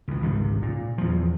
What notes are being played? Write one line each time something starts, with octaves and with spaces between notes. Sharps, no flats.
C#2 E3
G#1 C#2 C3
A#2
E2 F3